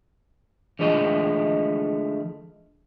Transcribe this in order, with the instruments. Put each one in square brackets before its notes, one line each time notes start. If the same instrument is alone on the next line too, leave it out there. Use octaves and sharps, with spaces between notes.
[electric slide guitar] D3 E3 F3 G#3 A3 D#5